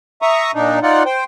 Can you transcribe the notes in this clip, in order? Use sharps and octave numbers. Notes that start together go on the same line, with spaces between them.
E5 A#5 C#6 D#6
A#2 D4 D#4
D#4 F4 D5 F#5
C5 G5